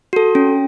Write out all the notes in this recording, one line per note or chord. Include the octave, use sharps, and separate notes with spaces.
F#4 A4
C#4